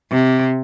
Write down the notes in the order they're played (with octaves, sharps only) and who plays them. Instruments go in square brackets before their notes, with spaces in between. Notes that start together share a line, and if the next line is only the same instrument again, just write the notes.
[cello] C3